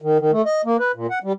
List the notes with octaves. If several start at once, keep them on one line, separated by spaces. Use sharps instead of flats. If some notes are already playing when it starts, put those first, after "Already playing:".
D#3
D#3
A3
D#5
A#3
B4
A#2
F#5
G3